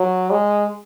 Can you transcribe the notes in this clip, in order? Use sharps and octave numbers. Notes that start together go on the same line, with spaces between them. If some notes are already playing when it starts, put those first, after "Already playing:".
Already playing: F#3
G#3